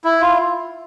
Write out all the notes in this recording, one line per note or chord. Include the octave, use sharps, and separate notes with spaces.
E4
F4